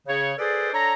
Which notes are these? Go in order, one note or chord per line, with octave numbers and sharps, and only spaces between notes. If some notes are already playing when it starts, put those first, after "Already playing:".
C#3 C#5
G#4 A4 B4 C5 D5
D4 A4 C#5 A#5